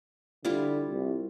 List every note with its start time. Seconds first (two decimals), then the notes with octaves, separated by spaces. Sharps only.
0.45 D3 G3 E4 F4
0.89 C2